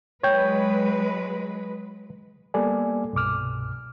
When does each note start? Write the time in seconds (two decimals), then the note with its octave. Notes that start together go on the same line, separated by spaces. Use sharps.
0.23 F#3 G#3 B4 C#5 G5
2.54 G3 A#3 B3 A4 D5 G#5
3.13 C2 G2 B2 D6 F6